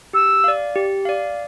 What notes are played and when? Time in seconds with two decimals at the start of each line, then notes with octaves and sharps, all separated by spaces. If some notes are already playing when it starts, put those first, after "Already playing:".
0.13 G4 E6
0.44 D5 F5
0.75 G4
1.05 D5 F5